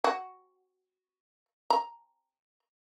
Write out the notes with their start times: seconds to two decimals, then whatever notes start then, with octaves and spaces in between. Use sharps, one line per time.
0.04 F#4
1.70 A#5